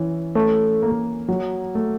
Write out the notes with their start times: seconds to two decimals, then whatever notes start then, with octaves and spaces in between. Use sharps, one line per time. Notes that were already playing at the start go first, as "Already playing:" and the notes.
Already playing: E3 C#4
0.35 A3 C#4
0.82 A#3
1.28 F#3
1.75 A3